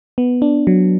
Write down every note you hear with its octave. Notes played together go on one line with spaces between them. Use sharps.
B3
D4
F#3